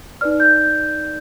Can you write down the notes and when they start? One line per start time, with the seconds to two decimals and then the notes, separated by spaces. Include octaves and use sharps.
0.21 D#4 B4 D5 F6
0.40 G6